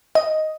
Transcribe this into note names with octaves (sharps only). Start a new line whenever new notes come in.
D#5